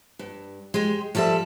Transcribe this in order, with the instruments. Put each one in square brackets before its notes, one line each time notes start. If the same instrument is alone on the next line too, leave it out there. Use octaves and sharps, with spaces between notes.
[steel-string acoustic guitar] G2
G#3 G4
F3 G3 A4 D#5 E5